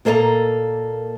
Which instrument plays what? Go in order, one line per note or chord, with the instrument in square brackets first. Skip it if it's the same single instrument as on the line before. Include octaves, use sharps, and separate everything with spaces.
[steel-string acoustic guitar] A#2 A#3 A4 D5 D#5 A#5